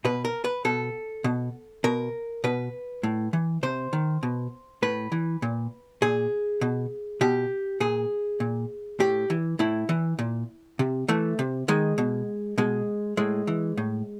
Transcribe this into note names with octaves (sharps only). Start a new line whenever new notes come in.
B2 B4
A#4
B4
B2 A4
B2
B2 A#4
B2 B4
A2
E3
C3 C5
D#3
B2
A2 B4
E3
A#2
A#2 G#4
B2
B2 G4
A#2 G#4
A#2
A2 G4
E3
A2 E4
E3
A#2
C3
E3 A3
C3
D#3 G#3
B2
B2 G#3
A2 G#3
E3
A2